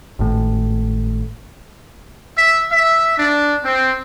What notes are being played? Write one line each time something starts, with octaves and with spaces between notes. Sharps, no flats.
G#1 A2
E5
E5
D4
C4